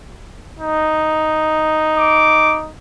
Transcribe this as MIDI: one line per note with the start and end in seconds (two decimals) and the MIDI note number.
0.59 2.69 63
1.98 2.59 86